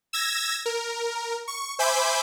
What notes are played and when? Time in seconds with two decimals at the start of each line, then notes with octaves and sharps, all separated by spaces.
0.13 E6 G#6 A#6
0.66 A#4
1.48 C#6
1.79 C5 E5 G#5 B5 D6 G6